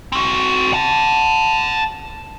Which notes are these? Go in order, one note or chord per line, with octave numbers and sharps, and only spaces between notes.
C4 F#4
F#5 A5